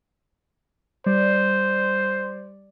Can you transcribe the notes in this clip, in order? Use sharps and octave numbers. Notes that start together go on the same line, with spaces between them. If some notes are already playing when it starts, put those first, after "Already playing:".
G3 C5 D5